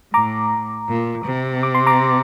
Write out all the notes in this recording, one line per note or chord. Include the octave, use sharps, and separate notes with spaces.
A2 A#5 D6
A#2
C3
D6
C6
A#5 D6